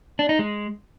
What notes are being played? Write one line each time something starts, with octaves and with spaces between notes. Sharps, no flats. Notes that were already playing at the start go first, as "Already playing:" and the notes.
D4
D#4
G#3